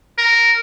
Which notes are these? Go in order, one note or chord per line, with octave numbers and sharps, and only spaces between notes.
A#4